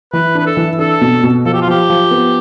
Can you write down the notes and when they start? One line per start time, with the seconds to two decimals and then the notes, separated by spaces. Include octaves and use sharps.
0.13 E3 B4
0.35 D4 B4
0.46 A4
0.57 E3
0.79 D4 A4
1.01 B2
1.23 B2
1.45 F3 A4
1.54 G4
1.62 F4
1.68 F3 G4
1.90 F3
2.11 B3